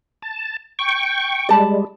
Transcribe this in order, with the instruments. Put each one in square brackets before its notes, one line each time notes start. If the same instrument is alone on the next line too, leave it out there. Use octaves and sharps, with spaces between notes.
[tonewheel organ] A5
G5 C#6
[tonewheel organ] G3 G#3 [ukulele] D5 A5 B5